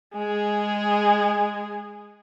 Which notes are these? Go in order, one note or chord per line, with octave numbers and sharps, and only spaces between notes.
G#3 G#4